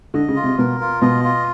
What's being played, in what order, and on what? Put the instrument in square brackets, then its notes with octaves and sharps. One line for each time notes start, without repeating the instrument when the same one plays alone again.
[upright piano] D3 [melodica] D#5
[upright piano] C#3
[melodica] F4
[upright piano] C3
[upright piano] B2 [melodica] A#4
[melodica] F4
[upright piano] B2 [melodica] D#5
[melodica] F4